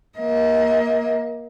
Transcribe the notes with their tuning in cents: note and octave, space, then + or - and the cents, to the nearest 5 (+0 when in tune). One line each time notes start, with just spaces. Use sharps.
A#3 +20 D#5 +40